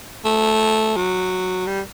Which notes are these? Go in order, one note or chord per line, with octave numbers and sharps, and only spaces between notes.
A3
F#3
G3